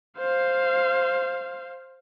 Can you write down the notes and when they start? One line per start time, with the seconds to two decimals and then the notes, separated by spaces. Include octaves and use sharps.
0.18 C5 F5